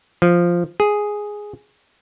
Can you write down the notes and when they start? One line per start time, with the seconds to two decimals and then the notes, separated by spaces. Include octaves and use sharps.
0.22 F3
0.80 G#4